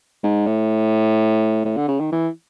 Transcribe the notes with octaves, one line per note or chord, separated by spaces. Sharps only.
G#2
A2
A2
D3
C#3
D#3
E3